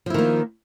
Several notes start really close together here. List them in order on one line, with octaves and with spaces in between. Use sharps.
F3 E4 D#3 A#3